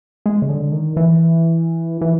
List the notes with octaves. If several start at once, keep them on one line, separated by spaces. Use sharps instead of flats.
G#3
C#3
D3
D#3
E3
E3